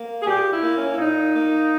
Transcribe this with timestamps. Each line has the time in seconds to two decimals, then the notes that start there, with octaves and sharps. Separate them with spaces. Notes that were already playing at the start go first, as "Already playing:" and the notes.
Already playing: A#3
0.22 G#4
0.27 A#2 G4
0.50 E4
0.63 A#3
0.74 C#4
0.92 E4
0.98 A#2 D#4
1.33 A#3